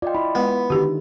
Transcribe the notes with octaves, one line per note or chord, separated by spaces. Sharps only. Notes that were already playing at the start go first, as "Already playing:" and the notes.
F4 D5 D#5 G5
E4 D5 B5
G#3 B3
D3 D#3 F#4 G4